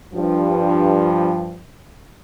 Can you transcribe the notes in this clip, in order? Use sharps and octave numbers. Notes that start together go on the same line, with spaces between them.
G2 F3